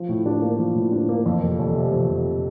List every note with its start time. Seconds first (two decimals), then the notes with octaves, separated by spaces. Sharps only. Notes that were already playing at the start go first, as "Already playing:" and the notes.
Already playing: F3
0.09 A2
0.26 D4
0.42 A#3
0.59 F3
0.75 A2
0.92 D4
1.09 A#3
1.26 F2
1.42 F1
1.59 F1
1.75 C3
1.92 F2
2.09 F1